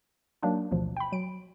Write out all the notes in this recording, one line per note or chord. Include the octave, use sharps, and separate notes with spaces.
F#3 A#3 D4 D#4
A1 D2 B2 F3
G5 B5
F#3 D7